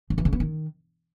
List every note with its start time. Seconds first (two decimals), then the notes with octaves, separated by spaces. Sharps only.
0.10 F3
0.18 E3
0.25 C#3
0.33 B3
0.40 D#3